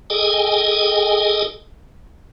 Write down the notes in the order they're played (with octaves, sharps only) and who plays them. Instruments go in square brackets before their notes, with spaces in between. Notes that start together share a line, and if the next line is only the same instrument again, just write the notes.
[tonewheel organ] G#4 A4 D#5 G5 G#5